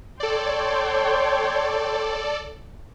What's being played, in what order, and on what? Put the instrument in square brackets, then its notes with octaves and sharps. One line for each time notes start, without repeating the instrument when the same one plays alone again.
[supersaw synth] A4 D5 [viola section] C#5 G5 C6